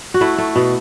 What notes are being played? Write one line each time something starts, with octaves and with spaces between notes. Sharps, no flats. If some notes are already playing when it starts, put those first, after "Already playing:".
F#4
A3 E4
A3
B2